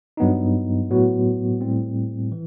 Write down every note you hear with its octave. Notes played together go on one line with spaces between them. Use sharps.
G2 F#3 B3 D#4
A2 F#3 B3 F#4
A2 G3 C4
E3